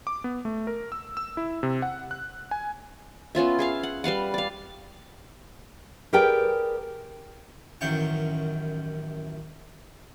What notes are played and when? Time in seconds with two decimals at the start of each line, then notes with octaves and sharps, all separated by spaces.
0.07 D6
0.24 B3
0.45 A3
0.67 A#4
0.92 E6
1.17 E6
1.37 E4
1.63 C3
1.82 F#5
2.11 F#6
2.51 G#5
3.35 B3 C#4 F4 E5
3.59 G#4 E5 F5
3.83 F#5
4.04 G3 B4 F5 F#5
4.34 D5 F5
6.13 G4 G#4 A#4 B4 D5 G5
7.81 A1 F#2 D#3 C5 G5 C#6